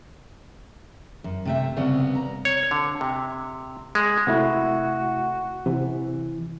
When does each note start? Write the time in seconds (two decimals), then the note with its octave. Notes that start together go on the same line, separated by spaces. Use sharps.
1.24 F#2
1.45 C3 A3 E5
1.77 C2 C#3 B3
2.15 A#5
2.45 C#5
2.71 D3
3.01 C3
3.95 G#3
4.27 C3 A3 E4 F#4
5.66 C3 E3